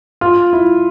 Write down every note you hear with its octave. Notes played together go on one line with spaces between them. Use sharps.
F4
E4